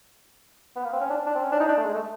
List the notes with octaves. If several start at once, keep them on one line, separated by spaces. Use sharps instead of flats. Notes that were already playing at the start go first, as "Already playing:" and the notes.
B3
A#3
C4
C#4
D4
D4
C4
C#4
D4
D#4
D4
A3
G#3
A3